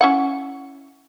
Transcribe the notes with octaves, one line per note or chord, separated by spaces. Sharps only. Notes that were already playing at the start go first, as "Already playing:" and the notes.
C#4 E4 F#5